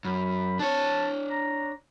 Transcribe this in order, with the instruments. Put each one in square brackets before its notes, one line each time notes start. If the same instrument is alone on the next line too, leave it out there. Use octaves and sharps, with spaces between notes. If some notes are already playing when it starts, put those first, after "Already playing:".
[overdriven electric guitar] F#2 [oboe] B5
[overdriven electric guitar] D4 C#5 [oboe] A5
[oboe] A#5